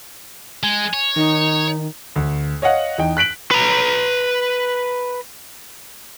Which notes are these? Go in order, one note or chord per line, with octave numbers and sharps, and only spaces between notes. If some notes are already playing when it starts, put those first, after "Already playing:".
G#3 G#5
C#5
D#3 D#4
D2
C#5 D#5 F5 F#5
E2 D#4 G5
F#6 B6 D7 F#7
B4 A#5